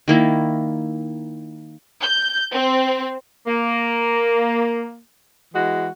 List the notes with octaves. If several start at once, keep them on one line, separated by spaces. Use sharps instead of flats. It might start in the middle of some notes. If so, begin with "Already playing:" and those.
D#3 A#3 E4
G6
C4
A#3
E3 G#3 F#4